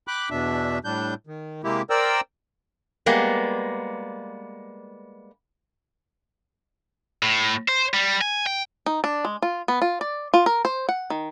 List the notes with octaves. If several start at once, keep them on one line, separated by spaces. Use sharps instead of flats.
G5 B5 D6 F#6
E2 B2 D4 E5
A2 G3 D4 G6
D#3
C3 G#3 A#3 E4 G4
A#4 C5 D5 G5 E6
G3 G#3 A#3 B3
A2
C5
G3
G#5
G5
D#4
D4
G#3
F4
B3
F4
D5
F4
A#4
C5
F#5
D#3